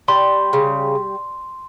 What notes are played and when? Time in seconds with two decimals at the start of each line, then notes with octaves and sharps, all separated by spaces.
0.08 G3 C6
0.53 C#3